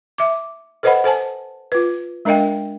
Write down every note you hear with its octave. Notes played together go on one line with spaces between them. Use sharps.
E5 D6
A4 B4 C5 D#5 F#5 B5
A4 C5 G#5 A5
F4 B4
G#3 D4 A#4 D#5 F5 G5